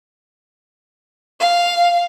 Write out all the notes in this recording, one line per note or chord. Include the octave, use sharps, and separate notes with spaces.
F5